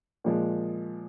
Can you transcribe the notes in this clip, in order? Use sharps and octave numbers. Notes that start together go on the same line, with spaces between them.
A#2 F3 G#3